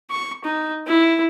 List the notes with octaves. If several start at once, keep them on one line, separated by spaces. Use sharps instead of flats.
C#6
D#4
E4